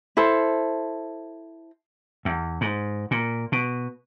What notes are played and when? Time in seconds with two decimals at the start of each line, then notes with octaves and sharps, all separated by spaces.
0.17 E4 A4 C5
2.25 E2
2.61 G#2
3.11 A#2
3.52 B2